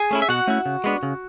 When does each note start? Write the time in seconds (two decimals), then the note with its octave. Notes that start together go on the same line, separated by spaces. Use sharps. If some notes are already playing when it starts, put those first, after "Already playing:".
Already playing: G#4 G#5
0.11 A3 C#4 E4
0.22 E5
0.29 B2 F#4 F#5
0.48 A3 C#4 E4
0.66 C#3
0.84 G#3 B3 D4
1.03 C#3